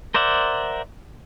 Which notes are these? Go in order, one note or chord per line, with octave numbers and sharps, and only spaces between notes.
A#4 C5 D5 E5 F#5